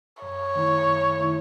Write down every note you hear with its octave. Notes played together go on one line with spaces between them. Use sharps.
F#2 C#5
D#3 A3 E4
F#2
D#3 A3 E4